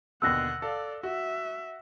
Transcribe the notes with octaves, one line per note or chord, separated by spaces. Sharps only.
D#2 B2 D3 F#5 E6 F#6 A#6
A4 D5 F5
F#4 E5